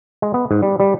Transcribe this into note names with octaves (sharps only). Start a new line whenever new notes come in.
G#3
B3
G#2
G3
G3